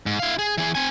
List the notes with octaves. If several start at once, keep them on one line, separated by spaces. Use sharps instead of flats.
G#2
E4 F5
G#4
E3 G#4
C4 G#5